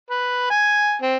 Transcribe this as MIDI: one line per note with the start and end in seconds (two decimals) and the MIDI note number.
0.10 0.47 71
0.50 0.96 80
1.02 1.17 60